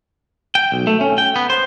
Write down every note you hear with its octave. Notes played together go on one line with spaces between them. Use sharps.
G5
B1
A3
C#4
G5
B3
C5